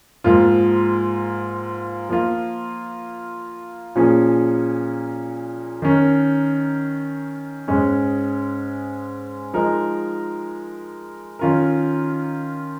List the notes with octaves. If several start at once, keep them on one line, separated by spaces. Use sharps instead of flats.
G#2 F3 A#3 F4
F3 A#3 F4
A#2 F3 A#3 C#4 G#4
D#3 C#4 A#4
G#2 G#3 C#4
F3 G#3 D#4 A#4
D#3 C#4 F4 A#4